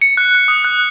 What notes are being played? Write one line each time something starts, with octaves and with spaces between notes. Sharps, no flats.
C#7
F#6
F#6
D#6
F#6